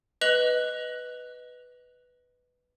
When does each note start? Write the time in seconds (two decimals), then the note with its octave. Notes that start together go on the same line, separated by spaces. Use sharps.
0.21 B4 D#5 F#6 F7 F#7